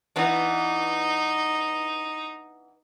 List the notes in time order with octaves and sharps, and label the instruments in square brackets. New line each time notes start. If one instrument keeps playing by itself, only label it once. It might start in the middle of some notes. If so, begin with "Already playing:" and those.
[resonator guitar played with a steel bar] E3 B3 D4 [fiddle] D#4